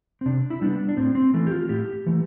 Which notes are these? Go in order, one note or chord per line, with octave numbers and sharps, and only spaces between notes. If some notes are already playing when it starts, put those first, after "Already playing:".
C4
C3 D4
E4
G3 B3 D4
D4
A2 C4
C4
E3 A3
G4
F4
A2 G4
E3 A3